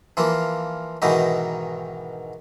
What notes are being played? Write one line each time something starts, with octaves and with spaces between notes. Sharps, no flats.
E3 F3 A#3 F4
G#2 B2 D#3 E3 D#4